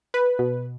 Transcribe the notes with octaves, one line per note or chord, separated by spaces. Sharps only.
B4
B2